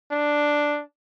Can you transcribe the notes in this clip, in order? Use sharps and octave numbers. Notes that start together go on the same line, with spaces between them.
D4